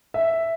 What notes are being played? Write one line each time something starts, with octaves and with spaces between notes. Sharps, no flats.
E5